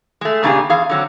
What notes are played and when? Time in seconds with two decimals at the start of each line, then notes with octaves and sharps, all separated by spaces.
0.21 G#3 A3
0.43 A#2 C#3 A#3 D4 G4 G#4
0.69 E2 G#4 F5
0.89 D3 F#3 C4